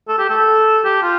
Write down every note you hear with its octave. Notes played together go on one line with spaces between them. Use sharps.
A4
G4
A4
G4
F4